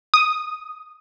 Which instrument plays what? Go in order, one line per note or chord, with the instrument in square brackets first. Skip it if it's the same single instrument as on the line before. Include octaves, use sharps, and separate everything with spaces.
[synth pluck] D#6